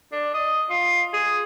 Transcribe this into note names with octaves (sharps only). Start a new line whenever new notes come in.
D4
D#5
F4
G#4